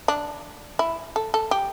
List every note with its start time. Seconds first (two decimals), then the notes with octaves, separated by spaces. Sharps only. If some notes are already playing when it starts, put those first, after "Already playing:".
0.08 D4
0.79 E4
1.16 A4
1.34 A4
1.51 G4